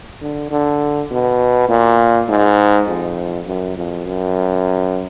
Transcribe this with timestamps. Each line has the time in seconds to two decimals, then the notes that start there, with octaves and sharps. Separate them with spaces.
0.21 D3
0.51 D3
1.11 B2
1.69 A#2
2.29 G#2
2.88 F2
3.47 F#2
3.77 F2
4.06 F#2